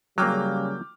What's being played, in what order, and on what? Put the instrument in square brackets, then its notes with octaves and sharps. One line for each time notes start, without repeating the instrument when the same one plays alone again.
[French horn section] C#3 G3 [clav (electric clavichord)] F#3 A#3 [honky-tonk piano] G5 D6 F6